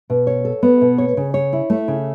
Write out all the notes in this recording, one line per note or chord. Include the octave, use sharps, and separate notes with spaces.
B2
C#5
A4
B3
B2
C#5
C#3
C#5
E4
A3
C#3